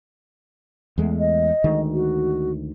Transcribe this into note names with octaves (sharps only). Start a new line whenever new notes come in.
E2 G#3 A3
D#5
D2 D#3 G#3
F#4